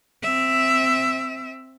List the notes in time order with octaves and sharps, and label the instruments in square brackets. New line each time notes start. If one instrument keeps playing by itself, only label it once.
[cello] C4 E5